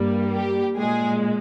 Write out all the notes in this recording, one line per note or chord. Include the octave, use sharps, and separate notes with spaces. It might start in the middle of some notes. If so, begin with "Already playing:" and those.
Already playing: G2 G3 A#3
G4
A#2 G#3 G#4